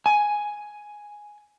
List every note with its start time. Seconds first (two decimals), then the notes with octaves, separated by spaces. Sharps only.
0.06 G#5